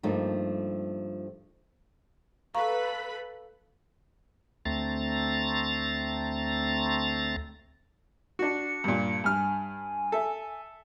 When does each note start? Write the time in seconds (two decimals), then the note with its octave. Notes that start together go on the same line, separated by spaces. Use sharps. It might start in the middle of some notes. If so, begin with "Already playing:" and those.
0.03 G2 F3 G3 A3 A#3 D#4
2.55 A4 B4 F5 A#5 B5 C#6
4.65 D2 A3 C4 A#5 A6
8.39 D4 F#4 C#7
8.84 G2 A#2
9.24 G2 G#5 F6
10.12 A4 E5